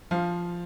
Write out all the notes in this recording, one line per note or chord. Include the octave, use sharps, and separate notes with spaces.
F3 F5